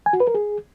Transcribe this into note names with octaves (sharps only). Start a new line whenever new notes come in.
G#5
F#4
B4
A#4
G#4